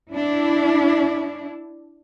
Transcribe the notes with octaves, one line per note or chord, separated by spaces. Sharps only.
D4 E4